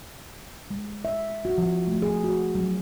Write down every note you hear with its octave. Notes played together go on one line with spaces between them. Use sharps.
G#3
E5
F#4
F3
A3
G#4
F#4
F#3